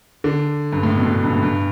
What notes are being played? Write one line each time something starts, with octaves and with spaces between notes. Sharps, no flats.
D3
G2
A2
B2
A2
G2
A2
G2